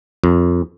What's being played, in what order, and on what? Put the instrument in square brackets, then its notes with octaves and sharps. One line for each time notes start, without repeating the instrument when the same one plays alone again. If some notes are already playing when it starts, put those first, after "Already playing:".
[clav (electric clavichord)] F2